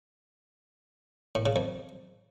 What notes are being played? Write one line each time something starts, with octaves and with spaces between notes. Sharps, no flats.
A2
C#3
F2